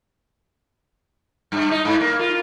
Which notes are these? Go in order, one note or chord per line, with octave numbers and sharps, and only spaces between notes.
G2
D#4
G#2
A#3
F4